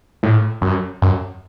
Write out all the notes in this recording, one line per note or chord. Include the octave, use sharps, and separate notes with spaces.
A2
F#2
F#2